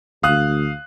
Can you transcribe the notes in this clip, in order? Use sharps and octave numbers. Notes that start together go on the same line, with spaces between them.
D2 F5 D#6 F#6